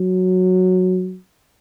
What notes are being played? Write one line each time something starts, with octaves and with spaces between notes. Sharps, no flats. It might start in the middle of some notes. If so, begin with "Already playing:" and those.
Already playing: F#3